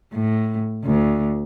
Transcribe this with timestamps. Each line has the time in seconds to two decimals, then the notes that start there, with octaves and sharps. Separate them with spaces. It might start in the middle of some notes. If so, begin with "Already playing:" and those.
0.14 A2
0.85 D2